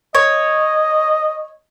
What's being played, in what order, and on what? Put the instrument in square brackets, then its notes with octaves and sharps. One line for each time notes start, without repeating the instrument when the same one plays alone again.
[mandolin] C#5 [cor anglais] D#5